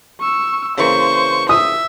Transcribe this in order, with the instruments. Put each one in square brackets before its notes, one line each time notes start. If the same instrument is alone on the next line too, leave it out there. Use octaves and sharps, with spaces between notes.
[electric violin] C#6 E6
[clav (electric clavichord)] C#3 E3 A#3 [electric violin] C5 [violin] C#6
[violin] E5 [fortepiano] D#6